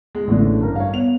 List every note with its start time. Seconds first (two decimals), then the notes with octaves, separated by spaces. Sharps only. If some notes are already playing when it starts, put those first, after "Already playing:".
0.15 G#3
0.27 A1 D3 A3 D4
0.61 G2 A#4
0.76 C#5 F5
0.92 B3 F7